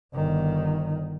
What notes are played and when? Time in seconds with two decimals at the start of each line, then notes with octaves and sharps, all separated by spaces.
0.15 G1 D#3